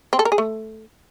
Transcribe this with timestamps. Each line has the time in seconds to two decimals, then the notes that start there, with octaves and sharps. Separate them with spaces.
0.13 C4
0.19 A4
0.25 A#4
0.32 G#4
0.38 A3